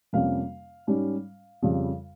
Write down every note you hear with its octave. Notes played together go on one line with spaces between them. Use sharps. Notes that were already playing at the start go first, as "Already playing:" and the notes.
F2 C3 G3 A#3 C#4 F5
G#2 G3 C#4
F2 C#3 G3